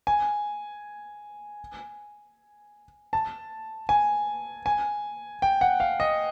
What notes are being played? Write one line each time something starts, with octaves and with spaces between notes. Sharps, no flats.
G#5
A5
G#5
G#5
G5
F#5
F5
D#5